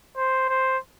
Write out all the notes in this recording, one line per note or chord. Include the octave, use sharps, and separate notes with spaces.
C5
C5